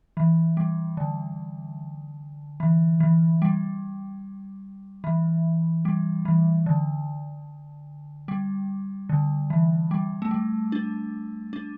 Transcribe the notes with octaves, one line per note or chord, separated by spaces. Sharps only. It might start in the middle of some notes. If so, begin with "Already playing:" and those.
E3
G3
D3
E3
E3
G3
E3
G3
E3
D3
G3
D3
E3
G3
A3
G3
D4
D4